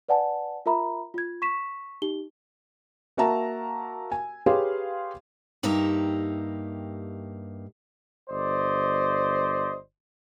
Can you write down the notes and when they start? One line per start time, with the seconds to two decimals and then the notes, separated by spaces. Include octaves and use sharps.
0.09 B4 D5 F#5 G#5 A5
0.66 F4 A#4 E5 A#5 B5
1.14 F4 G#6
1.42 C#6 B6 E7
2.02 D#4 G4 G7
3.17 A#3 F#4 A#4 E5 A5 A#5
4.12 G#5
4.46 G4 G#4 B4 C#5 F5 C6
5.63 G2 A#3 D#4 G4 E5 A#5
8.29 G1 C5 D5 D#5